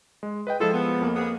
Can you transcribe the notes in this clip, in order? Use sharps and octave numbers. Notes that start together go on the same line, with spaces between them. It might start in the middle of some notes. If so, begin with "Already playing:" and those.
G#3
B4 D#5 G5
F3 G#3 E4 F4 G#4 A4
B3
F2 A#3
B3 G#4